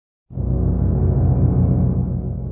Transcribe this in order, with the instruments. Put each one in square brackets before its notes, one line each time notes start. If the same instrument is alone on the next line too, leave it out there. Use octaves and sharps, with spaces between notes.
[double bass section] F1 B1 F#2 C#3